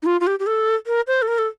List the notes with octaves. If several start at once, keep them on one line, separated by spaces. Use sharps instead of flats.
D#4
F4
F4
G4
G4
A4
A#4
C5
A4
A#4
A4